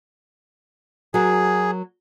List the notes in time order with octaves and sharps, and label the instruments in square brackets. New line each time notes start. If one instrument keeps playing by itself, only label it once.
[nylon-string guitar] F#3 F#4 A#4 [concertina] G#4